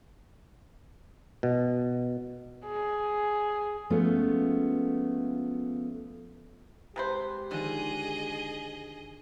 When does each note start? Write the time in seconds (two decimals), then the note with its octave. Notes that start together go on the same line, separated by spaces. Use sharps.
1.43 B2
2.65 G#4
3.90 F3 G#3 A3 B3 C#4 F4
6.96 C3 G#3 G4 B4 C5
7.51 D3 D#3 F3 G#4 D#5